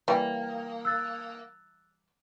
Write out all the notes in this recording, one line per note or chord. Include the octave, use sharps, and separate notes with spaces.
E3 G3 A#3 G5
E6 F#6 A6